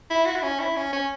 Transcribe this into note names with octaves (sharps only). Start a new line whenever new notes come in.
E4
F#4
E4
C#4
E4
C#4
C#4